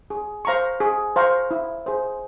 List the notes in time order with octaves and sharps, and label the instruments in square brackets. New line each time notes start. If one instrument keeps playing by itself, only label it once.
[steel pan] G#4
C5 F5 A#5 C#6
G#4
C5 F5 A#5 C#6
E4
G#4 C5